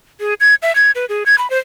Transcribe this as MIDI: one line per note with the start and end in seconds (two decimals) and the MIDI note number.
0.20 0.34 68
0.40 0.55 92
0.62 0.74 76
0.75 0.91 92
0.95 1.05 71
1.09 1.24 68
1.26 1.36 92
1.38 1.49 83
1.50 1.58 72